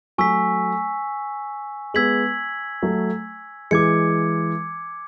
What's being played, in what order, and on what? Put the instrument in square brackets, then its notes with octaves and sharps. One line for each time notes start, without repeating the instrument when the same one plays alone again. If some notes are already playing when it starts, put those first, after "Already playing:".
[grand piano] F#3 A3 [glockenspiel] G#5 C#6 E6 B6
[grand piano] G#3 B3 [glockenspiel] E6 G#6 B6 F#7
[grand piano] F#3 A3
[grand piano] E3 G#3 [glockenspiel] D6 G#6 C#7